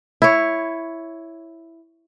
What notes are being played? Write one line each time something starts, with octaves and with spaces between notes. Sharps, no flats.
E4 C#5